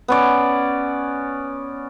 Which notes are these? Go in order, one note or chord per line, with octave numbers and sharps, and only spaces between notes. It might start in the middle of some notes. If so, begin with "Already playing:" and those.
B3 C#4 D5